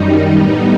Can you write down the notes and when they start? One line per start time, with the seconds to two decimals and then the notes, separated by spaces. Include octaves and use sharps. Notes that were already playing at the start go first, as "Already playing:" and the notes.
Already playing: F#2 D#3 G3 D#4
0.34 A2 G3 B3 D#4